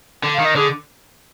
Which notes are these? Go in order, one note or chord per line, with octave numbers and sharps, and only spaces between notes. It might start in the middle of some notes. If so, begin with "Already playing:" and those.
D3
F5
D#3
D#5
D3 G#4